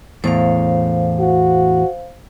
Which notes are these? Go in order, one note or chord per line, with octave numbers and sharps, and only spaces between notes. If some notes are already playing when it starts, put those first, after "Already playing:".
E2 A2 C5 F5
F#4